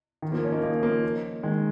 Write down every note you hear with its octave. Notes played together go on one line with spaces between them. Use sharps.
D#3
F3 A#3
C#4
A#3 D#4
A#3 D#4
F3 A#3
D#3 G#3